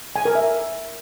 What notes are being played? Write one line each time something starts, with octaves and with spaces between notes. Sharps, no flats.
G#5
A#4
E5